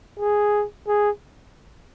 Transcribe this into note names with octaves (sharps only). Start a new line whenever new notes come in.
G#4
G#4